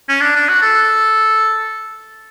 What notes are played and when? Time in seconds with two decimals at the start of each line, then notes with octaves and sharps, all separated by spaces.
0.09 C#4
0.21 D4
0.36 D4
0.49 F#4
0.62 A4